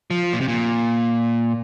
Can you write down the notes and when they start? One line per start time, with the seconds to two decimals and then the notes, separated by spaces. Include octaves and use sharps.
0.10 F3
0.33 A#2
0.41 C3
0.48 A#2